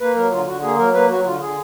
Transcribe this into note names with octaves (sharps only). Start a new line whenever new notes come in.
A#3 B4
F#3 A#4
D3 F4
D3 F#4
A#3 G#4
F#3 A#4
A#3 B4
F#3 F#4
D3 F4
D3 G#4